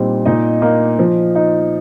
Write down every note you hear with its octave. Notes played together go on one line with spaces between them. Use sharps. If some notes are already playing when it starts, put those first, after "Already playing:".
Already playing: A#2 G3 C4 D#4
A#2 D#4 D#5
A#3 D#4
F3
D#4